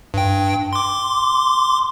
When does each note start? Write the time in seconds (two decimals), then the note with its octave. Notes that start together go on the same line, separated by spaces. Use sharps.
0.14 G2 G5
0.73 C6 D6